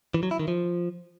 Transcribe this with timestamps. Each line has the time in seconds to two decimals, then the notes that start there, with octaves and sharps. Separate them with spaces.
0.14 E3
0.23 F#3
0.31 E4
0.39 D#3
0.48 F3